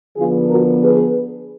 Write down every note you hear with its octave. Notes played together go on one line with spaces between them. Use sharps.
D3 F3 B3 F4 G#4
F#4 A#4
G#4 B4